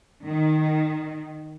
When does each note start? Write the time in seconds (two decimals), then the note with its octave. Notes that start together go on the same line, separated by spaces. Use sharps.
0.23 D#3